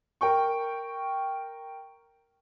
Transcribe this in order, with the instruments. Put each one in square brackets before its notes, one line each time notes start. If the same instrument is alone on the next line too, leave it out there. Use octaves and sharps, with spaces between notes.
[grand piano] A#4 G5 C#6